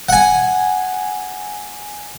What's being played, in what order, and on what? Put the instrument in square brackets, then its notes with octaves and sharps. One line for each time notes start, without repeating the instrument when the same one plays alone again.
[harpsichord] F#5 G#5